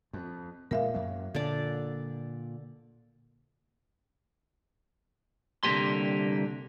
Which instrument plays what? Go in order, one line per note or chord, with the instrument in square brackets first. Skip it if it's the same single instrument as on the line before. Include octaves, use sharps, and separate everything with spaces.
[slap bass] F2
[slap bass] A#2 G#3 [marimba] A#4 E5 F5
[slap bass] F#2 F#3 A#3
[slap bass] A#2 [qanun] D3 D5
[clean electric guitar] C2 D3 F3 A#3 G4 C6